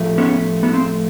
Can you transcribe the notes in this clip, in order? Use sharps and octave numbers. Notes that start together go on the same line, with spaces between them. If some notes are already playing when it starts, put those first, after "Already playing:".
Already playing: A2 F3 A3
B3 C#4
B3
C4